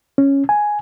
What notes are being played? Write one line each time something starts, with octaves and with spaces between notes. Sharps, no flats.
C#4
G#5